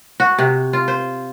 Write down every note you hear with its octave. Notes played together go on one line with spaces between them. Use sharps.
F#4
C3
F4
C5